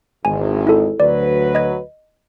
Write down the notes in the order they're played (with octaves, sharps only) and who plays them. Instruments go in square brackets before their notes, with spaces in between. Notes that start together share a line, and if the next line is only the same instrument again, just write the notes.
[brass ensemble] G#1 E2 G#3 [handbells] G#5
[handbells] E4 A4
[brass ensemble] D2 F#3 B4 [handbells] D5
[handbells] D#5 G#6